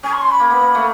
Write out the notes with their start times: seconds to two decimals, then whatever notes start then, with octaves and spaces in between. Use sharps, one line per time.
0.03 C#4 G#5
0.13 C#6
0.21 C6
0.30 B5
0.40 A#3
0.50 B3
0.61 A#3
0.75 A3